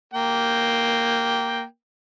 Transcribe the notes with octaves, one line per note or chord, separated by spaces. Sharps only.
A#3 G5